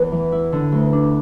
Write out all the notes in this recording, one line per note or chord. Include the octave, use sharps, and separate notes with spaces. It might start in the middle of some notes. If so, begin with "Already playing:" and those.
Already playing: E2 B3 B4
E3
E4
D3
D2
D4